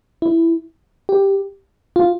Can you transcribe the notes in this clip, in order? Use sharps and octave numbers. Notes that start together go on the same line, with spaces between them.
E4
G4
F4